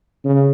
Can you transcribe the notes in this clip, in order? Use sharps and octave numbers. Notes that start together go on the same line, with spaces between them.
C#3